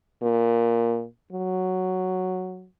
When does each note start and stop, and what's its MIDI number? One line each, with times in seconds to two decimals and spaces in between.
0.22 1.05 46
1.33 2.67 54